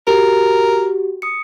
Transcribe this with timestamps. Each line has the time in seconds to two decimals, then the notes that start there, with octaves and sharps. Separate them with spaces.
0.07 F#4 G4 A#4
1.22 D#6 C#7